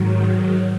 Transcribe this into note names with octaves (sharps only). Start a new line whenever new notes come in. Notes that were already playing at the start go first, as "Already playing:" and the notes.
Already playing: G#2 D#3 F#3